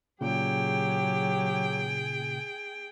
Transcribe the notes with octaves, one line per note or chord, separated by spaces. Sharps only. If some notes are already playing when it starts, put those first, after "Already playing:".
A#2 C#3 F#3 G4 G#4 G5